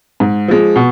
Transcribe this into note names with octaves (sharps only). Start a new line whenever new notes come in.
G#2
F3 G#3
B2